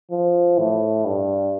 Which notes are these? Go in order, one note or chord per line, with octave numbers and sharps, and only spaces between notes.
F3
A2
G2